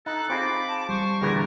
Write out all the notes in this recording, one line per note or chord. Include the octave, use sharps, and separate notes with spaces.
D#4 A4 F#6
C4 F4 G#4 B5 D6
A5
G3 C5 C#6
E2 A#2 D3 G#4 A#4 B4